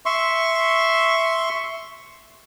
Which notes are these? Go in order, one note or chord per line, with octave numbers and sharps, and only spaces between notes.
E5 C6 C#6